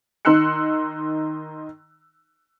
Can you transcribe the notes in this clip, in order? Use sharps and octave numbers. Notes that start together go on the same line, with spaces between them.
D#3 D#4 C6 E6 F#6 C#7